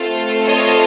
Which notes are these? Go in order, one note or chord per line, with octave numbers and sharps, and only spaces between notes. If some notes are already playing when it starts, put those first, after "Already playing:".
Already playing: A3 C4 F4 A4
C#5 D#5